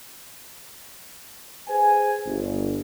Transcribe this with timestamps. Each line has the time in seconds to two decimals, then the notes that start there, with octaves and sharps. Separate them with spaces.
1.67 G#4 B4 C5 G#5
2.26 G1